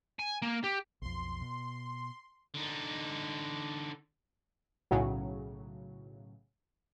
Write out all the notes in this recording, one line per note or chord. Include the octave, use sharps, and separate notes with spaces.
G#5
A#3
G4
B1 F2 C6
B2
D3 D#4
B1 A2 C#3 F#3